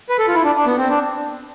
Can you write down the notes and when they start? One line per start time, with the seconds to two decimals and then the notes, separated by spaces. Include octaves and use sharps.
0.09 B4
0.19 A4
0.28 F4
0.35 E4
0.44 D4
0.55 D4
0.66 B3
0.78 C4
0.89 D4